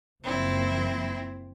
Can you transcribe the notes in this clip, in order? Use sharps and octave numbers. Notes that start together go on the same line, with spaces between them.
F#1 F3 A#3 C4 E4